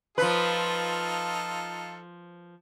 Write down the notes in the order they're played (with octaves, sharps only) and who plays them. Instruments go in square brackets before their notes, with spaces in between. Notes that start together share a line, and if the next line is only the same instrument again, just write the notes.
[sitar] F3 B4 [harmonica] D#4 F4 A4